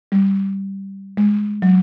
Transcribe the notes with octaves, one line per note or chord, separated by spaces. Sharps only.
G3
G#3
F#3